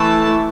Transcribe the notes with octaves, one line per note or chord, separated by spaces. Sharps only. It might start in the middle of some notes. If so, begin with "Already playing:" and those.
Already playing: E3 A3 E4 A5